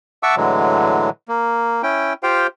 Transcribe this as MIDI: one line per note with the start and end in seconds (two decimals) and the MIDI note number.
0.23 0.35 76
0.23 0.35 78
0.23 0.35 81
0.23 0.35 85
0.23 0.35 86
0.23 0.35 88
0.37 1.10 45
0.37 1.10 50
0.37 1.10 52
0.37 1.10 54
0.37 1.10 56
1.28 1.82 58
1.83 2.13 61
1.83 2.13 64
1.83 2.13 79
2.23 2.47 65
2.23 2.47 67
2.23 2.47 72
2.23 2.47 77
2.23 2.47 79